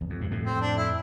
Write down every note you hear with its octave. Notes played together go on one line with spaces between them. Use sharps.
E2
F2
G2
F2 A2
C4
D4
E4